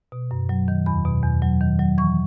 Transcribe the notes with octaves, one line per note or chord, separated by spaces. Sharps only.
B2
F#2
F#3
D#3
E2 B5
B2
E2
F#3
D#3
F#3
E3 C#6